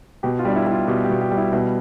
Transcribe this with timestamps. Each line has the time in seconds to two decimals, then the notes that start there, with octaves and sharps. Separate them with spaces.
0.23 B2 G4
0.39 F4
0.45 G3 D4
0.56 E4
0.67 G3
0.72 F4
0.88 B2 G4
1.04 G4
1.10 B2
1.21 G4
1.31 G3
1.37 E4
1.53 B2 E4